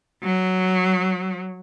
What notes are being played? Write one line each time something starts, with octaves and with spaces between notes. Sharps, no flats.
F#3